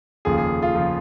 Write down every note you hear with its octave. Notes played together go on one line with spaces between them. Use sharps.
F1 D#2 C#3 F3 G#4
G#4
F4
C#3 F3